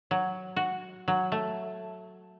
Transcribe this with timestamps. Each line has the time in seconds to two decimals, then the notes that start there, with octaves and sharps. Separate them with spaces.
0.11 F#3
0.56 F#4
1.08 F#3
1.32 A3